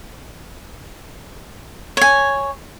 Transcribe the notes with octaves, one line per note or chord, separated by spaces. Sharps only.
C#5 G#5